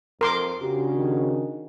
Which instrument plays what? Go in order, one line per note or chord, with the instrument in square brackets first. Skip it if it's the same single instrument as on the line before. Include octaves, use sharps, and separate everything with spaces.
[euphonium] F2 [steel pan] A#4 C6 D6
[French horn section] C#3 D4 F#4 [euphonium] G4
[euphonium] D#3